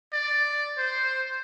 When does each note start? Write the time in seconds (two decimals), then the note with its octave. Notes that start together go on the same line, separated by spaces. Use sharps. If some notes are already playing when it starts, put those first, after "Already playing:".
0.13 D5
0.78 C5